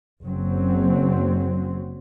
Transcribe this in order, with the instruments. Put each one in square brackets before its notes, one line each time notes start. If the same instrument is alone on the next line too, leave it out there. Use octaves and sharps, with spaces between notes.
[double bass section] F#1 F#3 C4